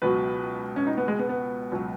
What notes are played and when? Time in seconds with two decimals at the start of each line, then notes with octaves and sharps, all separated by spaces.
0.02 C#2 B2 F#3 B4
0.76 C#4
0.87 D#4
0.98 B3
1.08 G#3
1.19 B3
1.29 B3
1.72 C#2 B2 F#3